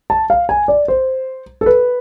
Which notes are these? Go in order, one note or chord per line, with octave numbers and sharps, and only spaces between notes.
A5
F5
G#5
D5
C5
A4
B4